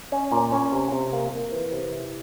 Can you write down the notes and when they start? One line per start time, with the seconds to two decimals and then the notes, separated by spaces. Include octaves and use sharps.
0.12 C#4
0.32 A#2
0.52 C#4
0.72 C3
0.92 C3
1.13 A#3
1.32 A#3
1.52 E3
1.72 C3
1.92 E4